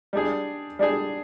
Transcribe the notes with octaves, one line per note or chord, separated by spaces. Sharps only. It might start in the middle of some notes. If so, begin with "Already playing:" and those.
G3 D4 G#4
G3 D4 G#4